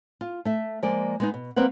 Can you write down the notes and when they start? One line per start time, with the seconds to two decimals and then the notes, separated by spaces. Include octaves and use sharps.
0.21 F4
0.45 A3 E5
0.83 F3 G#3 A#3 D5
1.20 G#3 B3 D#4
1.34 B2
1.56 G3 A#3 C4 B4 F#5